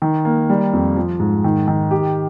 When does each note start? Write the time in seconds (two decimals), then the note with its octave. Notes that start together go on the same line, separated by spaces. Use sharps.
0.02 D#3
0.25 A#3
0.50 G3
0.73 F2
0.96 F3
1.20 G#2
1.44 D#3
1.67 D#3
1.91 G4